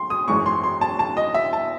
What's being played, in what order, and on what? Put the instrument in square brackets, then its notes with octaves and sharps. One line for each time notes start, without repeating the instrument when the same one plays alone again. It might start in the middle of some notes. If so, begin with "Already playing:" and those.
Already playing: [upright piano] C6
D#6
G#1 F#2 E3 G#3 C#6
C6
C6
A5
A5
D#5
E5
A5